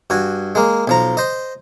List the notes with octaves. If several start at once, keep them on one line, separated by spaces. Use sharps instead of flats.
G2 F#4 G#5
G#3 A#3
B1 F3 A#5
C5 D#5